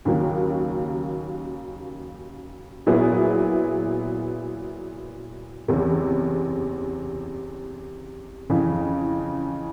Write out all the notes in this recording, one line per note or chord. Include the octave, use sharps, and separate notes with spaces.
D#2 C#3 F#3 A#3
A#2 F#3 B3 E4 G#4
F#1 E2 C3
F2 C#3 E3